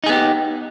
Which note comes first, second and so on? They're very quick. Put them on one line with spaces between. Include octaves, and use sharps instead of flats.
D#4 G#4 B3 G4